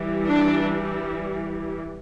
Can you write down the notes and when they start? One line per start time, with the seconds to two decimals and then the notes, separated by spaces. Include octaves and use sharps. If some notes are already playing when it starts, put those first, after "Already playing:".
Already playing: E3 G3
0.27 D4